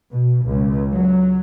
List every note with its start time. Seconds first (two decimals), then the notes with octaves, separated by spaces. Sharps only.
0.12 B2
0.45 C#2
0.93 F#3